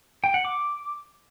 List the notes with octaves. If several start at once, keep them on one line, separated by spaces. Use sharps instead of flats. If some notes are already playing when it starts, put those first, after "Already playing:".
G5
F#5
D6